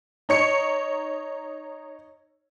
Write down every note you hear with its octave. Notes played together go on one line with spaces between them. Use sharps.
D#4 C#5 C#7